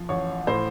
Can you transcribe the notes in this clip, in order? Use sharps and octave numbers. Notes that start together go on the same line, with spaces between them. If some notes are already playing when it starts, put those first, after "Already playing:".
Already playing: F3
A1 C#5
A2 C5